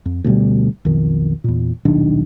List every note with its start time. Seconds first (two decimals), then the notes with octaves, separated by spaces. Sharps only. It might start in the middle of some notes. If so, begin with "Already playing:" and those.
0.06 F2
0.24 D2 B2 G3
0.85 B1 F2 D#3
1.44 E2 A#2
1.85 D#1 B1 D#3 D4